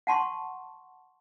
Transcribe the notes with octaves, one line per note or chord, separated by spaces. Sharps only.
F#5 A5 C6 C#6